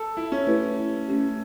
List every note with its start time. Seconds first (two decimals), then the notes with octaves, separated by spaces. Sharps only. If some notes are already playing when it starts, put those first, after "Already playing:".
Already playing: A4
0.17 E4
0.32 C#4
0.46 A3 E4 G4 B4
1.07 A3 C#4 G4